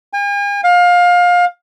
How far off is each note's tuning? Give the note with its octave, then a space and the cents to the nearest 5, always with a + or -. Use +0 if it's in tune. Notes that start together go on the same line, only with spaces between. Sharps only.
G#5 -45
F5 +25